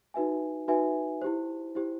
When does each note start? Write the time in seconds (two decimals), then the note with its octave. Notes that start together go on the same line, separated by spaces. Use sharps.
0.14 D#4 F#4 B4 E5 G#5
0.68 D#4 F#4 B4 E5 G#5
1.22 E4 G4 C5
1.75 E4 G4 C5